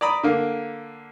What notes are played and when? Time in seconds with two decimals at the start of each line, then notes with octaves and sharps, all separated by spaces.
0.01 D5 A#5 B5 D#6
0.23 D3 A#3